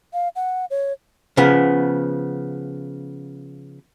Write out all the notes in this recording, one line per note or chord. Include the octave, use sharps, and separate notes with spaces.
F5
F#5
C#5
C#3 F3 B3